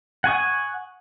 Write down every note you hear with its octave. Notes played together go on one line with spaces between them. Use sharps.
F#5 G#5 C#6 D#6